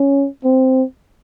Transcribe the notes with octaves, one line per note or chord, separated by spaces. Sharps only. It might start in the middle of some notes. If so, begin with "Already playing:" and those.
Already playing: C#4
C4